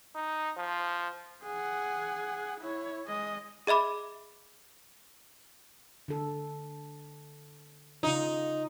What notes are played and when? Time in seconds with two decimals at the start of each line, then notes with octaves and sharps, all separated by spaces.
0.15 D#4
0.57 F3
1.43 G#4 F#5
2.60 E4 C#5
3.06 G#3 D#5
3.67 G#4 D#5 E5 B5 D6
6.08 D3 A4
8.03 C#3 D#4 F4